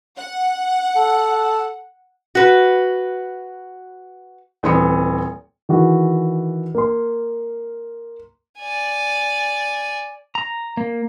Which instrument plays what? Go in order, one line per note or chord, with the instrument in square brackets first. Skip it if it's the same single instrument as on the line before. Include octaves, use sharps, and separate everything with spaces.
[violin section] F#5
[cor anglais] A4
[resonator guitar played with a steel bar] F#4 B4
[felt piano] D#1 E3 C4 C6 D#6 C#7
[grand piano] D#3 E3 F#4 G#4
A#3 C6
[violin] D5 G#5
[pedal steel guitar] A#5
A#3